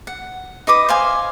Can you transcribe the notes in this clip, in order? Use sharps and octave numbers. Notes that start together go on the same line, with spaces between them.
F#5
D#4 B4 D6 D#6
C5 F5 G#5